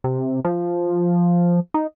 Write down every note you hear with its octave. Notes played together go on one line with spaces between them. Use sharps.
C3
F3
D#4